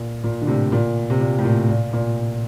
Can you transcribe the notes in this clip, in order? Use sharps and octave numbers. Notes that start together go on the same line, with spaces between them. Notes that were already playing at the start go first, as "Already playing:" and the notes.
Already playing: A#2
A#2
D3
A2 C3
A#2
C3
A#2
A2
A#2
A#2
A#2